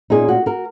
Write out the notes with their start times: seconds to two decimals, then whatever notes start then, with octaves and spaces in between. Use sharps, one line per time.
0.10 A#2 A#3 C#4 D#4 G#4
0.28 F#4
0.46 F#4 A#4